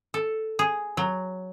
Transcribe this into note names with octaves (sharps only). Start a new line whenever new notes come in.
A4
G#4
F#3